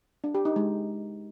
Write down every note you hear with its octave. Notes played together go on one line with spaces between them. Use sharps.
D4
G4
D#4
G#3